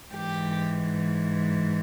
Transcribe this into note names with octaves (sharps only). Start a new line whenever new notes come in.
G#2 E3 G4